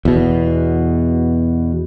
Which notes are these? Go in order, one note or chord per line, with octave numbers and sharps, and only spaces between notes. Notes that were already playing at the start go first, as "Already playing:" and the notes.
E2 B2